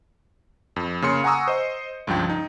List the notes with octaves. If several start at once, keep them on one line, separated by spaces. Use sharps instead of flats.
F2
C#3 A#3 C#4 C6 C#7
F#5 G#5 A#5 C#6 D#6 E6
C5 D#5
C#2 G2 F3 G5
D#4